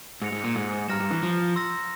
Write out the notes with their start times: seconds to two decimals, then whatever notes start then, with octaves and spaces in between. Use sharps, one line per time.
0.22 G#2 E6 A#6 C#7 F7
0.32 G#2
0.44 A#2
0.56 G#2
0.88 G2 A#5 F6 A#6 E7
1.00 G2
1.11 E3
1.23 F3
1.56 C6 E6 A#6